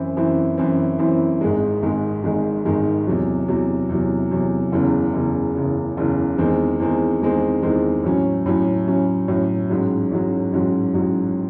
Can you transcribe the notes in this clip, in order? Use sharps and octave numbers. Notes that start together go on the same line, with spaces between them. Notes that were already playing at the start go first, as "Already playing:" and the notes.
Already playing: F#2 E3 C4 E4
F#2 E3 C4 E4
F#2 E3 C4 E4
F#2 E3 C4 E4
G#1 G#2 D#3 G#3
G#1 G#2 D#3 G#3
G#1 G#2 D#3 G#3
G#1 G#2 D#3 G#3
E2 C3 F#3
E2 C3 F#3
E2 C3 F#3
E2 C3 F#3
F#1 E2 C#3
F#1 E2 C#3
F#1 E2 C#3
F#1 E2 C#3
E2 D#3 G#3 C4
E2 D#3 G#3 C4
E2 D#3 G#3 C4
E2 D#3 G#3 C4
A2 F#3 C#4
A2 F#3 C#4
A2 F#3 C#4
A2 F#3 C#4
A1 G#2 F#3
A1 G#2 F#3
A1 G#2 F#3
A1 G#2 F#3